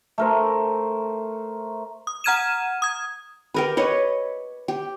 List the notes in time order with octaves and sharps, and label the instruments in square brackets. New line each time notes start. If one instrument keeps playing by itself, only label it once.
[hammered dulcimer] A3 A#4 C5
[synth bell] D#6
F#5 A#5 F6 G#6 D#7 E7
D#6 G#6
[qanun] G4 A#4 B4
B4 C#5 D#5
G4